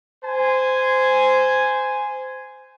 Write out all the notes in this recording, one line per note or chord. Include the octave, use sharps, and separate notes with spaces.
C5 G#5